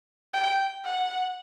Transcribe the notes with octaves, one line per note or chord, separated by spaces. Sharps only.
G5
F#5